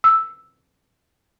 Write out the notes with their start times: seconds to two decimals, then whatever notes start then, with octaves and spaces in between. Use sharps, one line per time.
0.04 E6